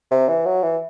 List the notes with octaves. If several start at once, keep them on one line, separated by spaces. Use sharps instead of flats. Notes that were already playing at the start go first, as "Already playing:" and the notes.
C3
E3
F#3
E3